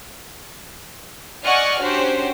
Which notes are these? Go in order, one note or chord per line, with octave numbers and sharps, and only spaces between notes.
D5 D#5 F#5 G#5 C#6 F6
C#4 D4 F#4 G4 C5